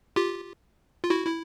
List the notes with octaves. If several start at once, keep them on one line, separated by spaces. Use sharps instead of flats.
F4 G4
F4
E4 F#4
E4